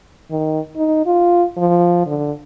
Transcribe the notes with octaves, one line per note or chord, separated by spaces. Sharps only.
D#3
D#4
F4
F3
D3